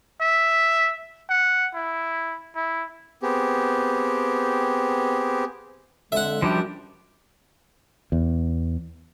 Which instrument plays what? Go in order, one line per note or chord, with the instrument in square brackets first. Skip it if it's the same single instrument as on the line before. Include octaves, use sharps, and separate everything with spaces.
[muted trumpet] E5
F#5
E4
E4
[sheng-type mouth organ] B3 C4 G4 G#4
[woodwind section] F2 D3 G#3 [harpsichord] E5 F#5
[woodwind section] F#2 D4 [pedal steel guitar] F3 G3 G4
[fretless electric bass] E2